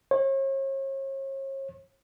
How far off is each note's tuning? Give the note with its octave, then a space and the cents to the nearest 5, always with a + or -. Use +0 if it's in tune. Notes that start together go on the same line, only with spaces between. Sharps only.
C#5 -40